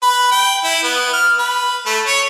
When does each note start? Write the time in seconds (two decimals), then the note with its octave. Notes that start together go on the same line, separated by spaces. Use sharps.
0.03 B4
0.31 G5
0.64 E4
0.83 B3
1.13 F6
1.39 B4
1.86 A3
2.06 C#5